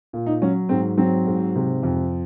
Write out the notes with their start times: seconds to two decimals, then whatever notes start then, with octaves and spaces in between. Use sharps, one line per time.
0.13 A#2
0.26 D#4
0.42 F#3 C#4
0.69 G#2 C4
0.98 F#3 C4
1.26 G#2
1.56 C3
1.83 F2